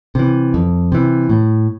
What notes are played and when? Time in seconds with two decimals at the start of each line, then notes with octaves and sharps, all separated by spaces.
0.15 C3 E3
0.54 F2
0.92 C3 E3
1.29 A2